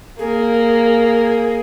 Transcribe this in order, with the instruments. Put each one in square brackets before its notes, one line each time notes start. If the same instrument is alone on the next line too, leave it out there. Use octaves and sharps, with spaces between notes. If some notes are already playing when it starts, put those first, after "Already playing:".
[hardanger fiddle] A#3 [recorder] G#4